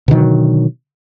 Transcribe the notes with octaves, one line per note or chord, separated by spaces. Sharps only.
B2 D3 D#3 F#3